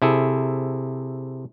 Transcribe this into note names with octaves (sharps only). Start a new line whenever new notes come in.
C3 E4 G#4 A4